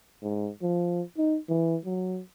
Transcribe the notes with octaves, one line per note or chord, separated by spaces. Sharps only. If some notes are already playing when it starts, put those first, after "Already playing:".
G#2
F3
D#4
E3
F#3